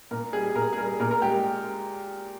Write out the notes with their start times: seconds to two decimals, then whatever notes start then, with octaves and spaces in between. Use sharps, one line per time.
0.11 A#2 A#4
0.33 G3 G#4
0.55 A#2 A#4
0.73 G#4
0.77 G3 A#4
1.00 A#2 A#4
1.11 A#4
1.22 G#3 G4